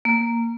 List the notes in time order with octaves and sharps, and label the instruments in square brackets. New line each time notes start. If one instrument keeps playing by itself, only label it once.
[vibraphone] A#3